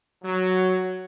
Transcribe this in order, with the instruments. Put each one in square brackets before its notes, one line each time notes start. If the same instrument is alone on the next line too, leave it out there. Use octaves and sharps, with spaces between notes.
[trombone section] F#3